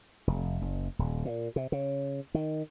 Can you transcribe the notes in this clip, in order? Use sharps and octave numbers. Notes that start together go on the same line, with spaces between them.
F1
F#1
D#1
A#2
C3
C#3
D#3